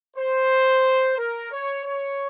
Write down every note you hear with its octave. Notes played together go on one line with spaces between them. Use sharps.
C5
A#4
C#5
C#5